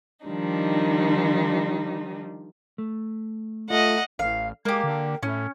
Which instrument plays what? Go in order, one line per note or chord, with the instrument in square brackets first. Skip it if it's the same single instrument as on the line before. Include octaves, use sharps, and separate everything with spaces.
[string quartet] D#3 F3 G3 D4 D#4
[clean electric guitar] A3
[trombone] A3 [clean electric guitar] F4 [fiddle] D#5 F#5
[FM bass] A1 [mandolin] F5
[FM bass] G#3 [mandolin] A#3 G4
[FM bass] D3
[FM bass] A2 [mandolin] C#4